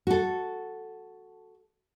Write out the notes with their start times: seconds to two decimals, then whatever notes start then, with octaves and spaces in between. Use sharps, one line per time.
0.07 F#4 A4